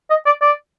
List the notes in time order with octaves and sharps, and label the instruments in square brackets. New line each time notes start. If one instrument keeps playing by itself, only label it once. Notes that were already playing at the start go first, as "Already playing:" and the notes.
[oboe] D#5
D5
D5